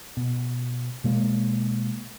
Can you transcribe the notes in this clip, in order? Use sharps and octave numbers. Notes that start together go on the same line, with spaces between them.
B2
B2 G#3 A#3